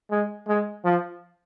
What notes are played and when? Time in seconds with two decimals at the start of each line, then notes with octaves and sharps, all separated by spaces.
0.11 G#3
0.48 G#3
0.85 F3